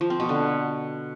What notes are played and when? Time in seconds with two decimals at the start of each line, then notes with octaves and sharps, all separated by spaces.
0.01 F3
0.10 C4
0.20 B2
0.29 D3